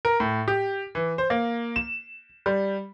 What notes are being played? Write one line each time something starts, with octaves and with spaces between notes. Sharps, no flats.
A#4
A2
G4
E3
C5
A#3
E7
G3